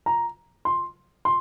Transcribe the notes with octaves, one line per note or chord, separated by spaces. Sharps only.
A#5
C6
C6